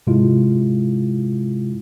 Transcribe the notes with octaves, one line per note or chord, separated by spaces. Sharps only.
G#2 C3 G#3 E4 F4